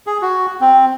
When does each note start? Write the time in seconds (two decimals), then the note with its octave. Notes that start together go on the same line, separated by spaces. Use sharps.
0.07 G#4
0.22 F#4
0.61 C4